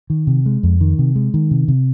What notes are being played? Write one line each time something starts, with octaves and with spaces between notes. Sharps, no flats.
D#3
C3
G#3
F2
D#3
C3
G#3
D#3
C3
C3